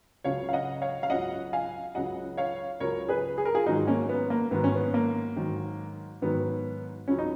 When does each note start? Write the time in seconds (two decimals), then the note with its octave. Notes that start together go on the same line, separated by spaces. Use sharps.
0.24 C#2 C#3 F#3 C#5 F5
0.49 F5
0.53 D#5 F#5
0.82 C#5 F5
1.03 F5
1.10 C#2 C#3 F#3 D#5 F#5
1.53 F5 G#5
1.95 C#2 C#3 F#3 D#5 F#5
2.37 C#5 F5
2.80 C#2 C#3 F#3 A#4 C#5
3.09 G#4 B4
3.38 G#4
3.45 A#4
3.54 F4 G#4
3.66 G#2 D#3 F#3 D#4 F#4
3.87 A#3 C#4
4.09 B3
4.30 A#3
4.51 G#2 D#3 F#3 B3
4.64 C#4
4.75 B3
4.94 A#3
5.36 G#2 D#3 F#3
6.22 G#2 D#3 F#3 B3
7.07 C#2 C#3 F#3 C#4
7.18 D#4